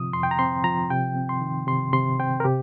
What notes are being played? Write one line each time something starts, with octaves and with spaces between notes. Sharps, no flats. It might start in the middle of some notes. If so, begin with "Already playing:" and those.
Already playing: C3 F3 C4 D#6
F2 C6
G5
A#5
C4 C6
F3 A#5
C3 G5
C4
C6
D#3
C3 C6
C3 C6
C4 G5
A#4
C3 G4